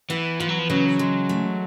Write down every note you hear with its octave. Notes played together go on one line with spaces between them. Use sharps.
E3 B3
E3 F3
F#3
F3
C#3 F#3
G#3
A3